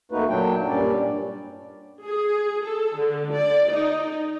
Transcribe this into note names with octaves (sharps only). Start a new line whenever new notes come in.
F2 A3 A#3 D#4 F#4 B4
A#2 F#3 D4 G5
G2 A#2 G3 C#4 D5
G#4
A4
D3
D5
D#4